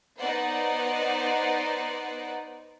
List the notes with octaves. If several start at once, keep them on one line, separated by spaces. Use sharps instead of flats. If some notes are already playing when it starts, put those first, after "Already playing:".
B3 D#4 C5 D5 F#5